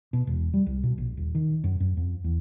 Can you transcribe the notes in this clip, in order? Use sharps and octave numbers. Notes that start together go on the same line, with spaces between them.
B2
E1
G3
C2
B2
A#1
D#1
D#3
F#2
F#2
F2
E2